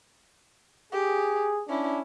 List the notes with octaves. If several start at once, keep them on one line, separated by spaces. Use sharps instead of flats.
G4 G#4
C#4 D4 E4